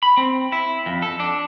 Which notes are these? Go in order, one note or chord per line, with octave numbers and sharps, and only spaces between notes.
B5
C4
E4
F2
A4
D4